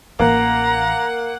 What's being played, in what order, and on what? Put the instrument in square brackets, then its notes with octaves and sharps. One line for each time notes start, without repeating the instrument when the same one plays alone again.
[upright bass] A1 E3 [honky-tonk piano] A#3 [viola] F#5 [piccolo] A#5